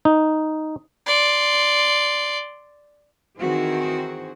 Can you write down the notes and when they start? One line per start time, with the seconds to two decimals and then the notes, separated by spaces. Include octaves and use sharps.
0.05 D#4
1.06 D5 C6
3.38 D#3 E3 C4 F#4 G#4 C5